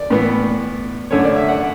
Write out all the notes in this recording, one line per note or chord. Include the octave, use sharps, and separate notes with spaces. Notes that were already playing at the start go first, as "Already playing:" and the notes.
Already playing: D5
A2 E3 B3
F#2 D3 A3 C#5
D5
E5
F#5